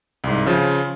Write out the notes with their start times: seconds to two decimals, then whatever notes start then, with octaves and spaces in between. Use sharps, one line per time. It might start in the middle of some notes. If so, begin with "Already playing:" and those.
0.24 C2 G#2
0.46 C#3 F3 F4